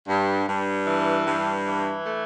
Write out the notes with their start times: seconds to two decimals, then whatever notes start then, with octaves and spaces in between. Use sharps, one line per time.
0.08 G2
0.48 G2
0.86 E3
1.26 G2
1.66 E3
2.05 A3